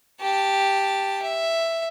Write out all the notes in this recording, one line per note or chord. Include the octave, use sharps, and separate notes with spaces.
G4 A5
E5